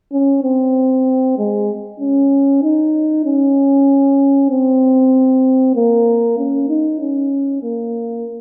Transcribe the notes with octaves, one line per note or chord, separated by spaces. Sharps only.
C#4
C4
G#3
C#4
D#4
C#4
C4
A#3
C#4
D#4
C#4
A#3